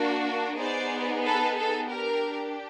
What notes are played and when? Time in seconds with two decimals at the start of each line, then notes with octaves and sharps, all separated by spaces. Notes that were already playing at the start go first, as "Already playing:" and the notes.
Already playing: A#3 D4 F#4
0.59 B3 D#4 G#4 C5 D5
1.24 A4 B4
1.57 A4
1.90 G4 A#4
1.95 D4